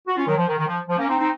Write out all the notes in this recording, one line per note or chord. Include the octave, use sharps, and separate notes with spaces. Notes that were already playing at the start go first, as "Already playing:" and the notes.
F#4
C#4 F4
D#3 F#3
F3
D#3
D#3
F3
F3
A#3 C#4
C4 D#4
C4 D#4